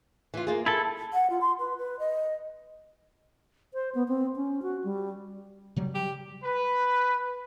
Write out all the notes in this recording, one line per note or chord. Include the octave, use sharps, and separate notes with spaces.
E3 F4
A#3 F4 G#4
E4 A4 A5
F#5
F4
C6
B4
B4
D#5
C5
B3
C4
C#4
F#4
G3
C#3 F#3 G3
G4
B4